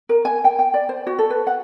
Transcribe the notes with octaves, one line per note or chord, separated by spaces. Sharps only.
A#4
G#5
G5
G5
D5
C5
F#4
A4
B4
F#5